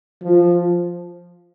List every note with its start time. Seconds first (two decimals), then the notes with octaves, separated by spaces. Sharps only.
0.23 F3